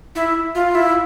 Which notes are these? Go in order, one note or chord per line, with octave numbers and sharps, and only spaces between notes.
E4
F4
E4